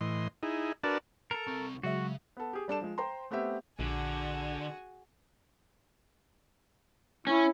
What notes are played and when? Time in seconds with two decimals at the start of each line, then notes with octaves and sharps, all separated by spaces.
0.01 A2 E3 D#5 C6
0.43 D#4 E4 G#4
0.83 D4 F#4 A#4 B4 D5 A5
1.31 A4 A#4 A#5
1.47 C2 C4 C#6
1.83 C#3 F#3 G#3 F#4 E5
2.37 B3 A4
2.53 G4 G#4
2.68 G3 D4 A4 E7
2.81 F3 G#3
2.98 C5 G5 A#5 C6
3.31 A3 B3 C4 G4 E5
3.79 A#1 D3 F#4 G#4
7.27 C#4 E4